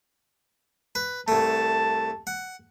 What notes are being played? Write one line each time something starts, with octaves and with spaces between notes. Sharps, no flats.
B4
C2 A3 A5
F#5